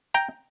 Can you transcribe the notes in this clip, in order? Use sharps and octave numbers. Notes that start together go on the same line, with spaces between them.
G5 A#5